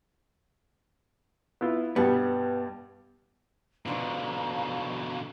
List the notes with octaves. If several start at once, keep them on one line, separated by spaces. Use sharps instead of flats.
B3 E4 F4
G2 B2 G3 B3
G#2 B2 D3 F3 D4 F5 A#5 C#6